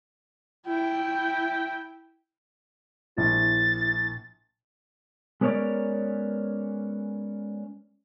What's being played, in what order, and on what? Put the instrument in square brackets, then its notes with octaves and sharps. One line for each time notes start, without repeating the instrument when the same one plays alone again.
[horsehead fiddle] E4 G5
[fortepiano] A#1 [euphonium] E4 [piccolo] A6
[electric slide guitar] G#3 B3 C#4 A#4 C#5 D5